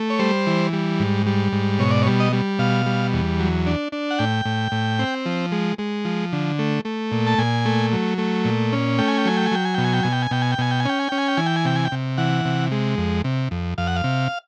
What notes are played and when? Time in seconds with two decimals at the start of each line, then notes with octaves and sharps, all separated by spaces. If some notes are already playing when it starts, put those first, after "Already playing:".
Already playing: A3
0.10 C#5
0.19 G3 C5
0.47 E3
0.73 G3
1.00 G#2
1.26 G3
1.52 G#2
1.79 B2 C#5
1.91 D5
2.03 C#5
2.06 G3
2.20 D#5
2.33 G3
2.59 B2 F5
2.86 G3
3.13 E2
3.40 F#3
3.66 D4
3.92 D4
4.11 F#5
4.19 A2 G5
4.45 A2
4.72 A2
4.99 C4
5.26 F3
5.52 G#3
5.78 G#3
6.05 F3
6.33 D3
6.59 A3
6.85 A3
7.11 A#2
7.27 A5
7.38 A#2 G#5
7.65 A3
7.93 F#3
8.18 A3
8.45 A#2
8.72 C#4
8.98 A3 G5
9.08 G#5
9.18 G5
9.25 F#3 G#5
9.37 G5
9.46 G#5
9.52 F#3 G5
9.65 G#5
9.74 B2 G5
9.84 G#5
9.93 G5
10.03 B2 G#5
10.13 G5
10.22 G#5
10.31 B2 G5
10.42 G#5
10.52 G5
10.58 B2 G#5
10.71 G5
10.80 G#5
10.85 C#4 G5
11.00 G#5
11.09 C#4 G5
11.18 G#5
11.28 G5
11.37 E3 G#5
11.46 G5
11.56 G#5
11.65 C3 G5
11.76 G#5
11.85 G5
11.92 C3
12.18 E3 F#5
12.45 C3
12.71 G#3
12.98 F2
13.24 C3
13.51 F2
13.78 F2 F5
13.87 F#5
13.96 F5
14.04 C3